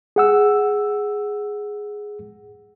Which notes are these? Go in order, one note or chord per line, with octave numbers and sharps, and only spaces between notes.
G#4 F#5 E6